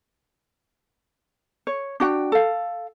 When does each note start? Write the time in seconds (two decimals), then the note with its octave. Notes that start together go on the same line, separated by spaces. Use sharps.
1.67 C#5
2.00 D4 F#4 G5
2.32 A4 F5